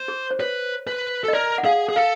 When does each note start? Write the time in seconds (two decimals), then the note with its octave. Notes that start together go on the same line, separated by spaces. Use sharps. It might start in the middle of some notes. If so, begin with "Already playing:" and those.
Already playing: C5
0.08 G#4
0.31 C5
0.40 B4 C#5
0.87 B4
1.24 A4
1.28 D#5
1.33 A#4 D5
1.58 F#5
1.65 G#4 F5
1.89 G#4
1.96 A4 F5